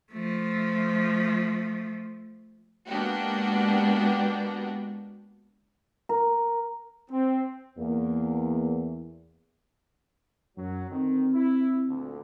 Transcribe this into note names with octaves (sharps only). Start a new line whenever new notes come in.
F3 A3
G#3 A#3 B3 D4 F#4 G4
A#4
C4
E2 A#3
F#2 F#3
D2 D#3 C4
E4
D2 A#2 D3